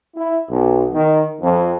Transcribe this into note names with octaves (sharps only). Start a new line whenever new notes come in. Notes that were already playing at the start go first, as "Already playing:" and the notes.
E4
B1
D#3
F2